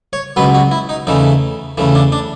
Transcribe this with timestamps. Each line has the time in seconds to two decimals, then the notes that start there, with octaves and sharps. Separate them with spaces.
0.13 C#5
0.36 C#2 B2 F#3 B3 B4
0.54 F#4
0.71 E4
0.89 D#4
1.07 E2 C#3 E3 A3 D#4
1.78 E2 C#3 E3 A3
1.95 D4
2.12 D4